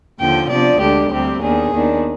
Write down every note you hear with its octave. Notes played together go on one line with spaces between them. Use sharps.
D#2 D3 F3 G5
C3 F3 B3 D4 D5
D2 D3 G#3 D4 G4
D2 C3 G3 C4 G4
D#2 D#3 B3 D4 G#4
D#2 D#3 B3 D4